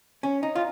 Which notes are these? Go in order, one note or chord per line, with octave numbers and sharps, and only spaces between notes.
C#4
D#4
F4